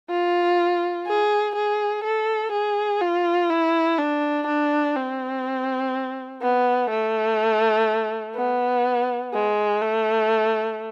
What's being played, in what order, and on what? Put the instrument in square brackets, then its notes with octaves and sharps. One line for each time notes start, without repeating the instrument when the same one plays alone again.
[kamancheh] F4
G#4
G#4
A4
G#4
F4
E4
D4
D4
C4
B3
A3
B3
G#3
A3